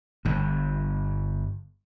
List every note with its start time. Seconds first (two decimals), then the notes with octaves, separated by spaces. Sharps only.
0.25 G1 G2